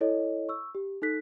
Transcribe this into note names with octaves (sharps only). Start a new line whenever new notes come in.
E4 A4 C#5 D#5
C#6 E6
G4
D#4 A4 F#6 B6